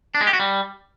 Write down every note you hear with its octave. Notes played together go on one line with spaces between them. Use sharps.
D4
G#3
G4
F#4
G3